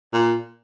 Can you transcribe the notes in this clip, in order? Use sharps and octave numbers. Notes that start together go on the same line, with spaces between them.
A#2